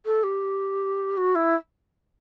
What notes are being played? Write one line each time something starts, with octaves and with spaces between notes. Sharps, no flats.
A4
G4
F#4
E4